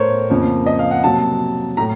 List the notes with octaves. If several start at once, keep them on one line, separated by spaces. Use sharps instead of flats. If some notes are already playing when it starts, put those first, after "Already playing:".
Already playing: A2 A3 A#4 C5 C#5
F2 C#3 F3 A#3
D#5
F5
F#5
C3 F#3 A#3 A5
A2 A3 A#5